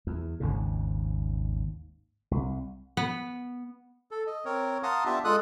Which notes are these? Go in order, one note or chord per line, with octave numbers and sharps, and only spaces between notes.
E2
G#1 D#2 G#2 C#3
C2
B3
A4
D#5
C4 A#4 C#5
F5 F#5 A5 A#5 C6 D#6
B3 D4 F4 G4 E5 A5
G#3 F4 A4 D#6 F#6